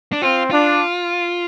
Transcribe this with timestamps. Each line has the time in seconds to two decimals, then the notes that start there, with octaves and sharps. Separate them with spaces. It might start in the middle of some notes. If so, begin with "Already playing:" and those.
0.13 D4
0.21 C4 F4
0.51 D4 F4